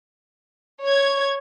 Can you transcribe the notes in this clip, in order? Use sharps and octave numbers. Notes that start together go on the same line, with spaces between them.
C#5 G#6